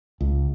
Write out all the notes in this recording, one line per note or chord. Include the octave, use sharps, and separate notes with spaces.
C#2